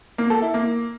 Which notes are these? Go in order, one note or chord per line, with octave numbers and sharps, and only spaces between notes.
A#3
A4
E4
A#3